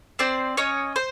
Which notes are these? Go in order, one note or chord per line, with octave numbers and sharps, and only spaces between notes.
C4 C5 D5
C#4 C#5 D#5
C5